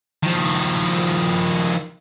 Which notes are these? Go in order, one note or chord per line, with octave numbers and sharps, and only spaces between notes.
D#3 F3